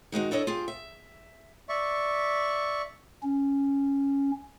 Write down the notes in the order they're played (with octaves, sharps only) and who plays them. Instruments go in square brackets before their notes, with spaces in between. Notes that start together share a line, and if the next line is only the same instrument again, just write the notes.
[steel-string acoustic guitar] D#3 G#3 D#4 F#4
D4 E4 A4 C#5 D#5
F4 G4 G#4
E5
[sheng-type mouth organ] D5 E5 C#6
[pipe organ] C#4